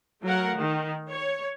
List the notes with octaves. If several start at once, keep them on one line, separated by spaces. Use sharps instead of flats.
F#3 A3 A#4 F5 F#5
D#3
C#5